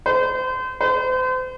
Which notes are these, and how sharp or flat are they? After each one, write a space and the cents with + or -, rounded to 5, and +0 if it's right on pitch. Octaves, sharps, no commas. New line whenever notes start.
C5 -30
C5 -35